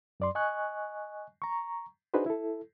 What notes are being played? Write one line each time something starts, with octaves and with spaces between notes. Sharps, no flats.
F#2 D5 C6
D#5 G#5 C#6 F#6
A#5 C#6
D4 D#4 F#4 G#4 B4 C5
E4 A4